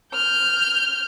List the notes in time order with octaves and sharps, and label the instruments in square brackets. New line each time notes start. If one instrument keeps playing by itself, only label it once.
[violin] F6 G6